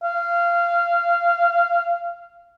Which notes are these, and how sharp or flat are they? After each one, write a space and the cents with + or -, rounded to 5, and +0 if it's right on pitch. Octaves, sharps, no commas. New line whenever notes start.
F5 -20